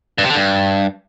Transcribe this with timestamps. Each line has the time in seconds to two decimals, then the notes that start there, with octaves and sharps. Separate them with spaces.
0.18 G2
0.24 C3
0.30 D3
0.35 G2